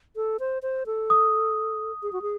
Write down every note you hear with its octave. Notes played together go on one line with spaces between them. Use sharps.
A4
C5
C5
A4
D#6
G#4
F#4
G#4